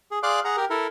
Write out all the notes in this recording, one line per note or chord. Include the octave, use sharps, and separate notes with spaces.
G#4
G#4 D5 F5 C6 D6 F#6
G#4 F#5 A#5
G4 A#4
E4 A4 A#4